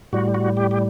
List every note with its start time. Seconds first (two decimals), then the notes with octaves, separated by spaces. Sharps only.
0.13 A2 G3 F#4
0.34 F#4
0.57 G4
0.71 G4